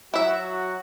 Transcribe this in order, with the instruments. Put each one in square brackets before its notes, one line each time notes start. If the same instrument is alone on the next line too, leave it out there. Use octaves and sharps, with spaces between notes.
[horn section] F#3 F#4 [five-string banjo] E4 E5